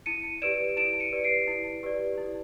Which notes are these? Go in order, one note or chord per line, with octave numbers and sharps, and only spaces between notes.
E4 C#7 D#7
G4 B4 D5 D7 E7
E4 D7 E7
C#7 D#7
G4 B4 D5
C7 D7
E4
G4 B4 D5
E4